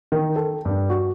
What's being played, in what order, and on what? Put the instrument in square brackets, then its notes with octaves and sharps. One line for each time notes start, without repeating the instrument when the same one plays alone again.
[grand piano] D#3
A4
G2
F#4